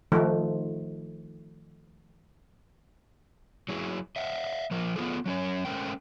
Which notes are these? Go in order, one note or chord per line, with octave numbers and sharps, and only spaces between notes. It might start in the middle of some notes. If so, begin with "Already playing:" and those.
D#3 F3 A3 D#4
F#3 E4 G#4
D#5 E5 F#5
F3 A#4
B3 C4 F4 G#4 A4
F#3 C#4 C#5
G#3 A3 C#4 A#4 C5 G5